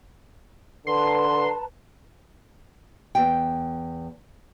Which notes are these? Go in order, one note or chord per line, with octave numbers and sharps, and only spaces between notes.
D3 B4 A5 A#5 C6
E2 G5